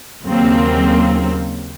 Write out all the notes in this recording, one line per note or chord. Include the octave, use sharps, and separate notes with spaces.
D#2 C#3 F#3 A#3 C4